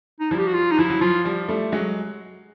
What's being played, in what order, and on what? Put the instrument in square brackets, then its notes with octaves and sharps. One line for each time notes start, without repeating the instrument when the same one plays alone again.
[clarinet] D#4
[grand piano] F3 G3 [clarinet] E4
[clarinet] G4
F#4
F4
D#4
[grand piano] F3 [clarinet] E4
[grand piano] F#3
[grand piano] F3 [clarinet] F4
[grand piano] F3 G3
G3 A3
F#3 G#3